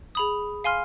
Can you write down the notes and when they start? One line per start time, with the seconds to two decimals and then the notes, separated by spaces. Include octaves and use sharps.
0.15 G#4 B5 D#6
0.64 F5 G#5 C6 F6